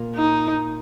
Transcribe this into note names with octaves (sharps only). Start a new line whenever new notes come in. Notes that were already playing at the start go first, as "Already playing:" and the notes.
Already playing: A#2 A#3
D#4